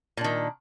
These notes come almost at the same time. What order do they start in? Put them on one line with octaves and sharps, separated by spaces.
A#2 D4 D#3